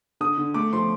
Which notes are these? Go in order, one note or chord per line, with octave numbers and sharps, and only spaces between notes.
D3 D#6
D3
A3 D6
F3 C6